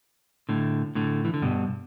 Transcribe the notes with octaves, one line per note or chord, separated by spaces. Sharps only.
A2 D3
A2 D3
E3
D3
G2 B2